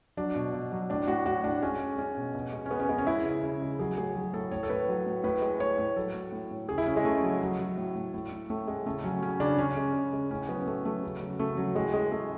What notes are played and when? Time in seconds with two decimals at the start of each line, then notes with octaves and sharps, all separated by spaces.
0.17 F#3 D4
0.35 B2
0.54 B2
0.72 F#3
0.90 A2 D4
1.08 A2 F#4
1.26 A2 F#4
1.44 A2 D4
1.62 G#3 C#4
1.80 G#3
1.98 G#3 C#4
2.17 B2
2.34 B2
2.53 G#3
2.66 C#4
2.71 G#3 B3
2.80 C#4
2.89 G#3 B3
2.98 C#4
3.07 G#3 E4
3.25 C#3
3.43 C#3
3.62 G#3
3.79 F#3 G#4
3.98 A2 G#4
4.15 F#3
4.33 A2 A4
4.51 A2 C#5
4.63 A4
4.70 A2 B4
4.88 F#3
5.06 A2
5.24 A2 B4
5.42 G#3
5.60 A2 C#5
5.78 A2 C#5
5.96 F#3 A4
6.14 A2
6.32 A2
6.51 A2
6.69 C#3 G#4
6.78 E4
6.87 C#3 C#4
6.96 G#3
7.05 C#3 A3
7.23 F#3
7.41 F#3
7.59 F#3
7.77 A2
7.95 A2
8.14 A2
8.32 A2
8.50 A2 A3
8.67 A2 G#3
8.85 C#3 A3
9.04 F#3 C#4
9.22 C#3 C#4
9.40 C#3 D4
9.58 C#3 C#4
9.77 G#3
9.94 C#3
10.13 G#3
10.31 A2 C#4
10.49 F#3 B3
10.67 A2 A3
10.85 F#3 A3
11.03 C#3
11.21 F#3
11.39 C#3 A3
11.57 F#3
11.75 A2 G#3
11.94 G#3
12.12 G#3 A3